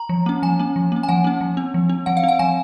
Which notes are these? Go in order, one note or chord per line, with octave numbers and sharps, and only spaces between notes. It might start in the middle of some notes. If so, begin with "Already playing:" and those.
Already playing: A#5
F3
A#3 C#4
F3 G#5
A#3 C#4
F3
A#3 C#4
G#5
F3 F#5
A#3 C#4
F3
C4
F3
C4
F3 F#5
F5
C4
F#5
F3 G#5